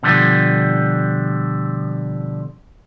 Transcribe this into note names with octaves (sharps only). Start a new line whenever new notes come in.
B2 D3 F3 G3